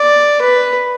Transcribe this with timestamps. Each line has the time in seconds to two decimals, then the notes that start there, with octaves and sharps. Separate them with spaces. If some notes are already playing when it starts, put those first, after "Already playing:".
Already playing: D5
0.41 B4